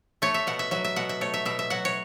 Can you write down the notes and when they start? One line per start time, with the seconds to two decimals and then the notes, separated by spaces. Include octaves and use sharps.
0.22 A3 C#5
0.34 E5
0.47 B2 F#5
0.59 E5
0.71 F#3 E5
0.84 E5
0.96 B2 F#5
1.09 E5
1.21 A3 C#5
1.34 E5
1.45 B2 E5
1.59 E5
1.70 F#3 F#5
1.85 C#5